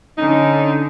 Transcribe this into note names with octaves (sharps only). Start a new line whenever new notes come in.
D3 C#4 D#4